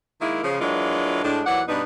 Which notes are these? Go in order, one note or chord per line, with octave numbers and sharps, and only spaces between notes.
D#3 G#3 A#3 E4
C#3 F3
E3 F#3 G#3 A#3 D4 F4
A2 G#3 D4
D#2 E3 F#3 D5 F#5
G2 B2 G3 B3 D4 D#4